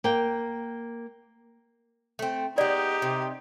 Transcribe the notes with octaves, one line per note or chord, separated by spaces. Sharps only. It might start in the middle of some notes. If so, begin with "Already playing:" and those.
A#3 G5
A3 C4
G#3 B3 D#4 G4 D5
C3